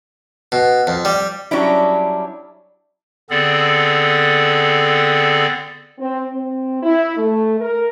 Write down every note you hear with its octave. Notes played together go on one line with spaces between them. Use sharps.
B2
F2
G3
F#3 G3 C#4 D4 E4
D3 B3 C4 G#4 A4 D5
C4
C4
E4
A3
A#4